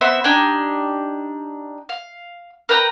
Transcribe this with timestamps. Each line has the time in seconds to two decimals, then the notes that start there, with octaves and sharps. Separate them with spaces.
0.01 B3 C4 E5
0.24 D4 D#4 G4 G#5
1.89 F5
2.69 A#4 B4 G5 A#5